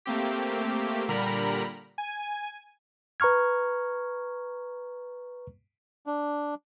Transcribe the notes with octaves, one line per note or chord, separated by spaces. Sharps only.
A3 A#3 C4 G4
A#2 D3 G3 A#4 A#5 B5
G#5
B4 A#5 C#6 F6 G#6
D4